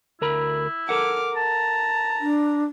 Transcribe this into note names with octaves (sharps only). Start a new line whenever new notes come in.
D2 E4 A#4 B5
A4 A#4 F#5 D6 F6
A5 A#5
D4